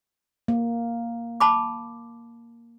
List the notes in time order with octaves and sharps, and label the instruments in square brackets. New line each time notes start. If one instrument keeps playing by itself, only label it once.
[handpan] A#3
[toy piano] A5 B5 D6